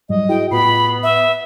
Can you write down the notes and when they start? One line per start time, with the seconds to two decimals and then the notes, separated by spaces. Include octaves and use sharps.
0.09 G#2 F#3 G3 D#5
0.29 E4 F#4 G#4 G5
0.51 A2 B3 F4 B5 C7
1.03 E5